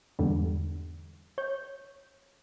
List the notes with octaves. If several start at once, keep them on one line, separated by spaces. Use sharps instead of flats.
E2 G#2 D3 G3
C#5 G6